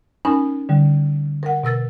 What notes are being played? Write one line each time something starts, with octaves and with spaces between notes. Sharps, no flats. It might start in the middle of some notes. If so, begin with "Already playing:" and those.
C#4 D#4 A#4 G#5 B5
D3 G3
A#4 F#5
B2 A#4 E6 A6